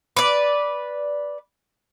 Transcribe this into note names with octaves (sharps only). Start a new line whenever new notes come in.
B4 D5